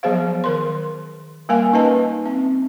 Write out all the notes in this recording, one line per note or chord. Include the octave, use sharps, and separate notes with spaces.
F3 F#3 B3 G#4 C5 F5
D#3 A#4 C6
G3 A#3 A#4 F5 G#5
C#4 D#4 B4 D#5 A5
C4 E5